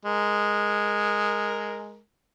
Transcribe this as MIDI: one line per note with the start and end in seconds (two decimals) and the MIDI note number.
0.05 1.99 56
0.05 1.99 70